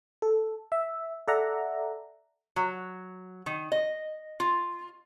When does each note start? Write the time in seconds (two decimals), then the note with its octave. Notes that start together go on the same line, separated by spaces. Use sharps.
0.22 A4
0.72 E5
1.28 A4 D5 E5 F#5 A#5
2.56 F#3
3.46 D#3
3.72 D#5
4.40 F4